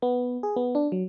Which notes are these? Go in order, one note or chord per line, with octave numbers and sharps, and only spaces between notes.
B3
G#4
B3
D4
F#3